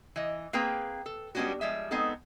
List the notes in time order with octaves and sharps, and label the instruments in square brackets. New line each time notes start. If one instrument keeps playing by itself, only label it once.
[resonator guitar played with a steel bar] E3 D#5
A#3 C4 G#4 B4 G5 A#5
A4
G3 G#3 B3 C#4 D4 F#4
F3 G3 G#3 E5
G#3 B3 C4 D#4 A4